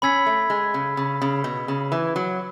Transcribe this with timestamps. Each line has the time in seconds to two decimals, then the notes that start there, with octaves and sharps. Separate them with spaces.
0.02 C#4 B5 E6 G#6 B6
0.26 A3
0.50 G#3
0.74 C#3
0.97 C#3
1.22 C#3
1.44 B2
1.68 C#3
1.92 E3
2.16 F#3